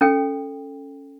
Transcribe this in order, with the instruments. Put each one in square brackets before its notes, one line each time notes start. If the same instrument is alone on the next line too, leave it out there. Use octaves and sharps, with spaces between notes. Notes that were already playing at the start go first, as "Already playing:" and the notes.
[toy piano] C#4 A4 G5